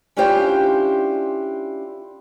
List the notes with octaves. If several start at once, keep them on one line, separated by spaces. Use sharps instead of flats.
C#4 D4 E4 F4 G4 C5